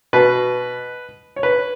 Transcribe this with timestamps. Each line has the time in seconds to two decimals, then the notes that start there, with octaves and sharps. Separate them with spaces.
0.13 B2 B4
1.36 C#5
1.43 B4